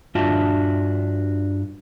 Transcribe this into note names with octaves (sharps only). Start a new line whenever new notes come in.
G2 D4 F4 F#4 E5 A5